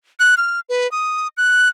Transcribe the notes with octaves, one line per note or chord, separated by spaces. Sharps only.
F#6
F6
B4
D#6
F#6